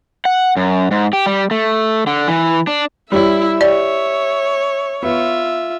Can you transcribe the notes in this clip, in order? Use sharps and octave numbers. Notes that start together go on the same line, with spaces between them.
F#5
F#2
G#2
G4
G3
A3
D3
E3
D4
G3 E4 G4 C#5 E5
G4 C#5 D5
B3 F4 E5